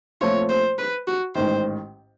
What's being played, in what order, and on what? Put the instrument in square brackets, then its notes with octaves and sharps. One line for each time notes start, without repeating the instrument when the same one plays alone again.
[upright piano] A#2 F3 A3 C4 F4 [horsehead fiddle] C#5
[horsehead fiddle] C5
B4
F#4
[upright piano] A1 G#2 D#3 [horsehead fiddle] C5